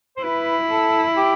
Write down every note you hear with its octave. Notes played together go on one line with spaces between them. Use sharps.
C5
E4 B4
A4
G4